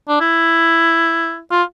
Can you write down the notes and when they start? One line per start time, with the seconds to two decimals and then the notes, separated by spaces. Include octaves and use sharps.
0.09 D4
0.21 E4
1.51 F4